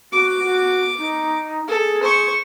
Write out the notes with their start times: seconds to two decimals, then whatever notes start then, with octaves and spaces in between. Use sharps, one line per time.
0.12 F#4 D6
0.44 F#4
0.98 D#4
1.68 G#4 A4
2.03 C5 C#6